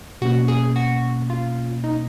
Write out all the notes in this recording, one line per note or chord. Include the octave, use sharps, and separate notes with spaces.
B2 A#3 C#4 F#4
G#4
F#4
F4
D#4